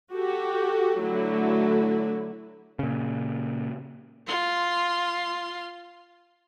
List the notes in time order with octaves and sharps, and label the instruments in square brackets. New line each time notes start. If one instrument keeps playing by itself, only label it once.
[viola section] F#4 G4 A4
D3 F#3 A3 E4
[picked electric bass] A#2 C#3
[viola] F4 C6